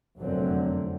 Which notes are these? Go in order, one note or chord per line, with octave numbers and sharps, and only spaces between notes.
F1 F#2 D3 F#3 C4